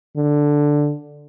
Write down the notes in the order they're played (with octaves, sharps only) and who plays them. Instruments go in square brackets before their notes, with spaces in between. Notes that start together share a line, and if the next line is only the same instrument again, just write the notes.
[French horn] D3